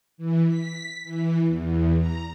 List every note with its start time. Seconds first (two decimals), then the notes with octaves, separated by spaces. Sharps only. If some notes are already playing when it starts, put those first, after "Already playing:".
0.18 E3
0.47 B6
1.04 E3
1.45 E2
1.99 A#5